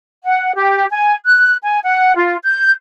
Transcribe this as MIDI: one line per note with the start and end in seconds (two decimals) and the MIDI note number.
0.24 0.52 78
0.56 0.85 67
0.91 1.14 80
1.26 1.55 90
1.63 1.79 80
1.83 2.15 78
2.16 2.37 65
2.44 2.71 91